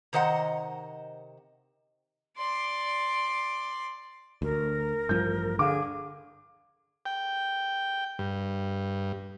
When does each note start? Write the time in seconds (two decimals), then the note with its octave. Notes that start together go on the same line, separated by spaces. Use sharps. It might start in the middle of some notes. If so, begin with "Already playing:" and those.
0.13 C3 D#3 C5 D#5 F#5
2.37 D5 C6
4.42 D2 A#4
5.09 A1 G2 F3 G6
5.59 D3 G#4 F5 D6
7.06 G5
8.19 G2